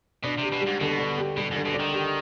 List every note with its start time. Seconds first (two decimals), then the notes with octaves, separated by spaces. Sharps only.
0.24 B2 D4
0.38 C3 G4
0.52 B2
0.61 G3
0.67 G#2
0.81 B2 D3
0.99 D4
1.18 G4
1.37 B2 G3
1.51 G#2 D3
1.65 B2
1.74 D4
1.80 D#3
1.93 G4